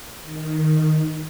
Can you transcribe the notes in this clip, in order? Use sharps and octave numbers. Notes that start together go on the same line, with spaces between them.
D#3